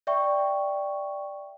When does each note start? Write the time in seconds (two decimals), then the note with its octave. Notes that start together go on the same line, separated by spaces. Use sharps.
0.07 D5 E5 G5 C#6